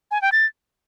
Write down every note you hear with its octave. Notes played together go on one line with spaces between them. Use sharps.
G#5
G5
A6